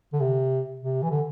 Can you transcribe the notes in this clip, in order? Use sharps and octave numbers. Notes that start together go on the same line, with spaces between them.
D3
C3
C3
E3
D3